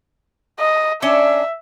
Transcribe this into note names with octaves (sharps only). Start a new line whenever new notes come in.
D#5
C#4 D4 C#5 E5